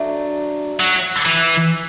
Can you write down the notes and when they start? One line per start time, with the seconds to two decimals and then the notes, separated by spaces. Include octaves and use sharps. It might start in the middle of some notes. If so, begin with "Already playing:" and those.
Already playing: F#3 A3 D4
0.80 F#3
1.26 E3